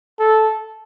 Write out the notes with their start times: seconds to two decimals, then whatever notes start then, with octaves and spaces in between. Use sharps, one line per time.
0.19 A4